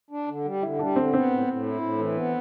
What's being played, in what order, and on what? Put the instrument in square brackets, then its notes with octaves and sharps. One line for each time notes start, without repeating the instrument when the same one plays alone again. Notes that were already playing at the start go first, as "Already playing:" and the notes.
[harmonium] D4
D3
G3
[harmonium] D3 [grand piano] E4
[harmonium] G3 [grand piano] D4
[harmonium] D3 [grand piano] C4
[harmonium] B3 [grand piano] C4
[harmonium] A2
A2
E4
A2
E3
B3